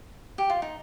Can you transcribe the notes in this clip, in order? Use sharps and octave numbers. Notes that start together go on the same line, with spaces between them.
G4
F4
D#4